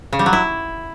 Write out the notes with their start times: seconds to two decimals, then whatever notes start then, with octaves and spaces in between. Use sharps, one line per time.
0.13 C#3
0.19 G3
0.26 F#3
0.33 E4